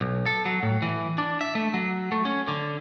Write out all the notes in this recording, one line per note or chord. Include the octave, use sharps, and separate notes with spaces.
B1
A4
F#3
A2
E3
D4
E5
A3
F#3
A3
C#4
D3